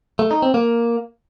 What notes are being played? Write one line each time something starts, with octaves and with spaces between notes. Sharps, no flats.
A3
D#4
C4
A#3